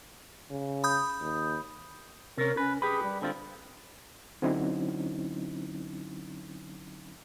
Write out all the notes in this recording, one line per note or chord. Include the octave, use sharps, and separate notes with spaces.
C#3
B5 D#6 G6
D#2
C3 C#4 A#4
C#4 B4
G4 G#4 B4
G3
D3 C4 F4
D3 F#3 C4 C#4 D#4 E4